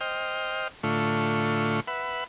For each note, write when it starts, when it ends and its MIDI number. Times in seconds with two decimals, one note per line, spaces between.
0.01 0.68 72
0.01 0.68 75
0.01 0.68 79
0.01 0.68 89
0.83 1.80 45
0.83 1.80 50
0.83 1.80 57
0.83 1.80 65
0.83 1.80 85
1.88 2.24 71
1.88 2.24 76
1.88 2.24 78
1.88 2.24 83